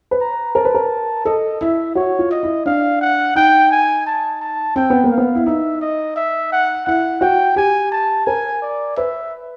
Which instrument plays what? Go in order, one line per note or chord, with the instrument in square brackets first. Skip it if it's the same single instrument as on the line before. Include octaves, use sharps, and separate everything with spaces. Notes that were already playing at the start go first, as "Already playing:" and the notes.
[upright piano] B4
[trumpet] A#5
[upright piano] A#4 [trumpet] A5
[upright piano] B4
A#4
[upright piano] A4 [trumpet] D#5
[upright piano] E4 [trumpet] E5
[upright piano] F#4 [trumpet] C#5
[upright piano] F4
[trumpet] D#5
[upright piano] E4
[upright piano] D4 [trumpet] F5
[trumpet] F#5
[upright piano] D#4 [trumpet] G5
[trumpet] G#5
A5
A5
[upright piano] C4 [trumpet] G5
[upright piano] B3
A#3
[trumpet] F5
[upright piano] B3
E4
[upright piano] D#4 [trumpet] E5
[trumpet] D#5
E5
F#5
[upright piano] E4 [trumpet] F#5
[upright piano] F#4 [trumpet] G5
[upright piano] G4 [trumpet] G#5
[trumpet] A5
[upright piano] A#4 [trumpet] G#5
[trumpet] D5
[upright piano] B4 [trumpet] E5